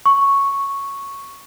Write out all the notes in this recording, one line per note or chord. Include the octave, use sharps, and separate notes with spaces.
C#6